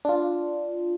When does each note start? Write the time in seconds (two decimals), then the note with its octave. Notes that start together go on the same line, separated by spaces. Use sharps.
0.05 D4 F4